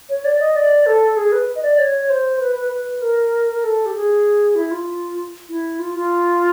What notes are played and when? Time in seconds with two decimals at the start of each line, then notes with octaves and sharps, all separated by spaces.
0.09 C#5
0.25 D5
0.40 D#5
0.56 D5
0.86 A4
1.16 G#4
1.32 B4
1.55 D#5
1.63 D5
1.78 C#5
2.10 C5
2.40 B4
2.56 B4
2.71 B4
3.01 A#4
3.52 A#4
3.64 A4
3.86 G4
3.95 G#4
4.55 E4
4.71 F4
5.49 E4
5.79 F4
5.95 F4